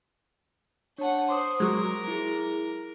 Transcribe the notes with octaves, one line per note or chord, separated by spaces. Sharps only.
D4 C#5 F#5 A5
C5 C6 D6 D#6
F#3 G#3 A#4
E4 G#4